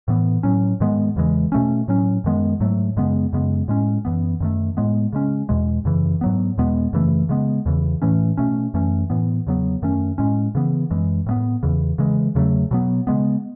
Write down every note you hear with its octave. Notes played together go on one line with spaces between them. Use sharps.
A2 E3 B3
A2 F#3 C#4
G#2 D#3 G#3 B3
E2 C#3 E3 G#3
B2 A3 C#4
A2 F#3 C#4
F#2 D#3 G#3 B3
G#2 F#3 A3
F#2 C#3 G#3 B3
F#2 C#3 G#3 B3
A2 G#3 C#4
F#2 E3 B3
F#2 D#3 A3
A2 G#3 B3
C#3 G#3 C#4
E2 B2 G#3
F#2 C#3 E3
G#2 F#3 B3
E2 B2 G#3 B3
F#2 C#3 E3 A3
C#3 G#3 B3
E2 C#3 E3
A2 E3 A3 C#4
B2 A3 C#4
F#2 E3 A3 C#4
A2 E3 B3
E2 C#3 F#3 B3
F#2 D#3 A3 C#4
A2 G#3 C#4
C#3 E3 B3
F#2 E3 G#3
A2 G#3 B3
E2 C#3 E3
C#3 E3 G#3
E2 C#3 F#3 A3
B2 F#3 B3
C#3 G#3 B3